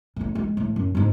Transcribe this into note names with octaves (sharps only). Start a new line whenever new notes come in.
A1 A2
G#3
A2
F#2
F2 G#2